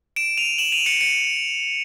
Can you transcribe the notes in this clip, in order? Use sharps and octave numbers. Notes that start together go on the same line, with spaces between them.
D7 E7
D#7 F7
E7 F#7
D#7 F7
C#7 D#7
C#7 D#7